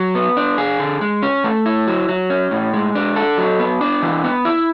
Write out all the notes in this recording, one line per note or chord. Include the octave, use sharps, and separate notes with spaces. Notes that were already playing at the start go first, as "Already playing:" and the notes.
Already playing: F#3
B3
D4
G#4
D3
G#3
C#4
A3
E4
F#3
F#3
C#4
A2
G#3
D4
A4
F#3
B3
D4
E3
B3
E4